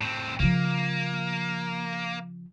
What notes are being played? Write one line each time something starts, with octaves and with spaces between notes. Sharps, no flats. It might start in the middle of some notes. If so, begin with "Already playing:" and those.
A2 C4
C#3 F3 A#3